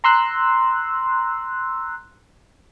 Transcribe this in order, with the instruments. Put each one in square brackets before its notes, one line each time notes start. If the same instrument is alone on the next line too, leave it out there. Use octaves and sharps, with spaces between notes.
[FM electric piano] A#5 C6 E6 F#6